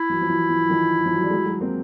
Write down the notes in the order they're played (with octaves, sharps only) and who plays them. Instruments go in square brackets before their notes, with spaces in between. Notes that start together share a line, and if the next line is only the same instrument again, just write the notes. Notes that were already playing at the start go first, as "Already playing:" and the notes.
Already playing: [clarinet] E4
[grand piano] E3 F#3
F3
E3 F#3
E3 F#3
D#3 F3
F3
F#3
G3
F#3 G#3
F#3 G#3
A#3 C4